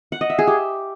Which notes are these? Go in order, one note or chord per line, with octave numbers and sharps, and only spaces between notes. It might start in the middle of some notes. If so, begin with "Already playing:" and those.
F#5
D#5
E5
G#4
G4